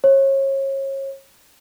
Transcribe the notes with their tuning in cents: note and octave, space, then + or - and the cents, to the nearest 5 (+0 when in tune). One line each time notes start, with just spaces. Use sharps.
C#5 -35